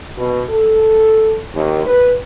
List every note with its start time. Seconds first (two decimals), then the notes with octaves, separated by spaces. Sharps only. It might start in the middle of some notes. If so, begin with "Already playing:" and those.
0.18 B2
0.50 A4
1.54 D#2
1.85 B4